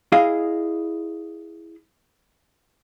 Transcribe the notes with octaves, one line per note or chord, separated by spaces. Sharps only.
E4 G#4 D#5 F5